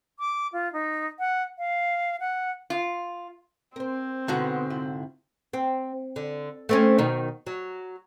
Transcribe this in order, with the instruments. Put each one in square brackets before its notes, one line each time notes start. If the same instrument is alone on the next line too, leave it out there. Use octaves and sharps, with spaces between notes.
[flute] D6
F4
D#4
F#5
F5
F#5
[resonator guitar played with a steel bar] F4
[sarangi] C4 [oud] A#4 C5
[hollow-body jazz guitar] G#2 D3 F#4 [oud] B2 E3 B3
[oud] C3 E4 F4
C4
D3
A3 C4 C#4
B2 D#3
F#3